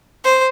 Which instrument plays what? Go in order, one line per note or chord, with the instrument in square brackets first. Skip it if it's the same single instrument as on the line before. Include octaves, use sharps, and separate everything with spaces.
[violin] C5